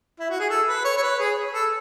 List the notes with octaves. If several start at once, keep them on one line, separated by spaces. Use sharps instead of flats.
E4
F#4
G#4
A4
B4
C#5
C#5
B4
G#4
A4